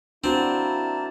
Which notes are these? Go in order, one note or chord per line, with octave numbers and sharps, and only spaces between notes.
A#3 C4 D4 E4 F#4 A5